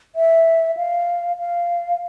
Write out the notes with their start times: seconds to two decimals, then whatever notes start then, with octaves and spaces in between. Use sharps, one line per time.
0.16 E5
0.77 F5
1.39 F5